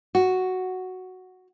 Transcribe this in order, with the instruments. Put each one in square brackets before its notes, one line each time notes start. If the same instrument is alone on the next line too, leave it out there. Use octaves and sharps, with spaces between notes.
[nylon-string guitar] F#4